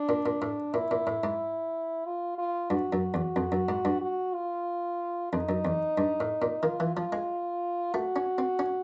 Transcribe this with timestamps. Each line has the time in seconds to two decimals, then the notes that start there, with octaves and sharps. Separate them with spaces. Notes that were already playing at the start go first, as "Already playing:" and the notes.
Already playing: D4
0.09 A#2
0.26 A#2
0.42 A2
0.74 A#2 E4
0.91 A#2
1.07 A2
1.24 G#2
2.05 F4
2.38 F4
2.70 G2 F#4
2.93 F#2
3.14 E2
3.36 F2
3.52 F#2
3.69 G#2
3.85 G2
4.02 F#4
4.34 F4
5.33 F2 D#4
5.49 F#2
5.65 E2
5.98 G2
6.20 A2
6.42 A#2
6.63 D#3 F4
6.80 E3
6.96 F3 F4
7.12 G#3
7.94 A3 F#4
8.16 C#4
8.38 C4
8.59 C#4